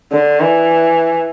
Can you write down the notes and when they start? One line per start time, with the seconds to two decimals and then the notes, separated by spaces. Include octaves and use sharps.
0.12 D3
0.41 E3